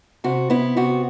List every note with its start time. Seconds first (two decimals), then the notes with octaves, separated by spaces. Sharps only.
0.24 C3 F#4
0.50 B3 E4
0.77 C3 F#4